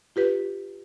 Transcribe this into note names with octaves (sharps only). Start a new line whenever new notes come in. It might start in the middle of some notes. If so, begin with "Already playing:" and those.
F4 G4 B4